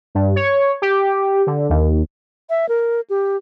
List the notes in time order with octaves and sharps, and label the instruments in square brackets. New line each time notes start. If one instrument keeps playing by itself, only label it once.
[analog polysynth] G2
C#5
G4
D3
D#2
[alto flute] E5
A#4
G4